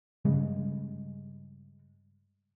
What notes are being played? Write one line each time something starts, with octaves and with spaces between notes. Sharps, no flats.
G2 C#3 G3 G#3